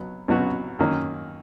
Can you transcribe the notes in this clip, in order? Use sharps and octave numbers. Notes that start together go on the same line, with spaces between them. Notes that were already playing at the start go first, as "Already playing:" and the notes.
Already playing: B1 B2 F#3 B3
B1 B2 F#3 B3 F#4
F#2 D#3 A#3 C#4